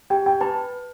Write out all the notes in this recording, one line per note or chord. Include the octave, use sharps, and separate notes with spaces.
G4 G5
G5
B4 A5